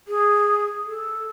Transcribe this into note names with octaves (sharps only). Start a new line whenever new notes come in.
G#4
A4